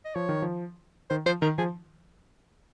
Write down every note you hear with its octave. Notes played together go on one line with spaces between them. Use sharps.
D#5
F3 C#5
D#3
F3
D#3 C5
F3 C5
D#3 A#4
F3 G#4